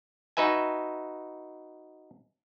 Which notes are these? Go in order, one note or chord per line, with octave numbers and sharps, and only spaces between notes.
D#4 F#4 B4 E5 G#5